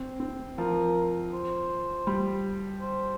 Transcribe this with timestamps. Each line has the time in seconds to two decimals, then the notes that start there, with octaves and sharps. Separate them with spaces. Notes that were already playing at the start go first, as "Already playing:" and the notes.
Already playing: C4
0.20 C4
0.57 F3 A#4
1.33 C5
2.07 G3
2.81 C5